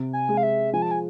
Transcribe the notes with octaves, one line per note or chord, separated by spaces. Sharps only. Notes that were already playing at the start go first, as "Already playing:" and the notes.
Already playing: C3
G#5
G#3
F5
E5
F3 G#5
A5
G#5